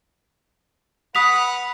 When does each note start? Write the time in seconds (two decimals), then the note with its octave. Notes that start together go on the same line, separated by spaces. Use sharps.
1.15 B4 F#5 B5 D#6 B6 F7